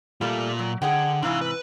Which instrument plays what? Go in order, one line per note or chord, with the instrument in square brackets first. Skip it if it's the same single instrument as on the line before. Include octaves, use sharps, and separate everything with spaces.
[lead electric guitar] A#2 F4 [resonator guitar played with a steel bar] G3 A3 A#3
[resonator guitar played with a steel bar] F#3
[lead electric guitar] D3 [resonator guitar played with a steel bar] G#4 F#5 G5
[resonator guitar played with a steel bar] G#2 C3 E3 [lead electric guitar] D4 F5
[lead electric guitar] B4